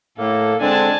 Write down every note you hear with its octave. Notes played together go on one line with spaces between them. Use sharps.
A2 A#3 A4
D3 G#3 C4 D4 G#5 A5